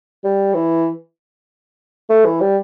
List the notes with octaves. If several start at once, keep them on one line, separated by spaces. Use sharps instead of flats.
G3
E3
A3
E3
G3